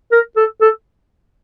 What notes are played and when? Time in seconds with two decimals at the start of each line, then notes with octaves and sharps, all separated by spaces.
0.12 A#4
0.37 A4
0.61 A4